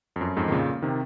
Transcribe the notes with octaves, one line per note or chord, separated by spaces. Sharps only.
F2
F#2
F2 G#2
D#3
A#2 C#3
C3 D#3